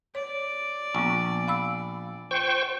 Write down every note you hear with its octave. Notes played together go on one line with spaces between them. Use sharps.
C#5 D5
A#1 B3 C#6
F5 B5 E6
F4 C5 G5 C#6